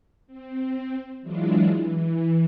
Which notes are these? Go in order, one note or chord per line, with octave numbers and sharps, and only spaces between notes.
C4
E3 F#3 G#3 D4 E4 F4
E3